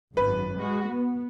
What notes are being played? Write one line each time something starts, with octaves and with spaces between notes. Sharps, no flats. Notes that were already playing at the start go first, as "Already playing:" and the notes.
G#1 F#2 B4
G#3 F#4
B3